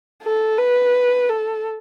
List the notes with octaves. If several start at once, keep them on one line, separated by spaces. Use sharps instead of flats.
A4
B4
A4